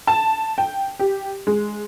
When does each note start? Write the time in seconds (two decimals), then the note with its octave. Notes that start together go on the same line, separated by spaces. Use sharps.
0.07 A5
0.58 G5
0.99 G4
1.47 G#3